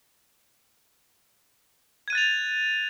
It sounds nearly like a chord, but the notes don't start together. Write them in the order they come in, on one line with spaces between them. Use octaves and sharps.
G#6 D#7 F#6 A6 F7